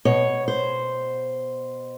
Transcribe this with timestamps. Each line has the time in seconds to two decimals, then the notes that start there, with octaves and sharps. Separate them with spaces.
0.05 B2 C#5
0.48 C5